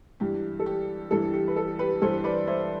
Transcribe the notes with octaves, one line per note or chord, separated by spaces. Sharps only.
G2 E3 G4
A4
G4
G2 E3 A4
G4
B4
A4
G4 B4
G2 E3 A4 C5
B4 D5
C5 E5